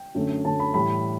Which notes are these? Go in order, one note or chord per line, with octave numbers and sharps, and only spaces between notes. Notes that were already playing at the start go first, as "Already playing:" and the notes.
Already playing: G5
F#2 D3 A3 C#4
F#2 D3 A3 C#4 A5
B5
A2 E3 G3 B5